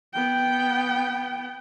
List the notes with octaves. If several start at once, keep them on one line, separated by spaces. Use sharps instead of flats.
B3 G5